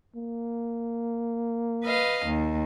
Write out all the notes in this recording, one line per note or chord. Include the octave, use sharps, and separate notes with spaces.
A#3
B4 D#5 F5
D#2